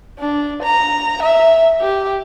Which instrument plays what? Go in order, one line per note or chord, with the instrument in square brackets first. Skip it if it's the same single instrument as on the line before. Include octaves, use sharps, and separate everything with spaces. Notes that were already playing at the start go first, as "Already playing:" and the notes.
[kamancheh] D4
A#5
E5
G4